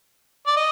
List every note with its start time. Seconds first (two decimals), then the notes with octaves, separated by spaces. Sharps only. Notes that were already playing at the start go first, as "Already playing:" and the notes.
0.47 D5
0.57 D#5